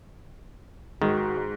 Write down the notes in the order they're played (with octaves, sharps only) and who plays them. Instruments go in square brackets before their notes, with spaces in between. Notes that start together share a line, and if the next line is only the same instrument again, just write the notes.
[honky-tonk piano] G#2 [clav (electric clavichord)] D#3 [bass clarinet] F#4